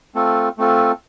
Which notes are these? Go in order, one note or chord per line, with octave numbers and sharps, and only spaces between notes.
A3 C4 F4 A4
A3 C4 F4 A4